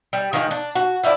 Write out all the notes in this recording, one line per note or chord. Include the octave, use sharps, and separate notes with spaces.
G3
D#3 F3 F#3 G#3
D4
F#4
F3 E4 A4 D5